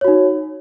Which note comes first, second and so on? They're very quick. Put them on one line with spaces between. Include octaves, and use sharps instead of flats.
C#5 F#4 D#4